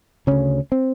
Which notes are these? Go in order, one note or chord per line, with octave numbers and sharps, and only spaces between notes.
D2 C#3 C#4
C4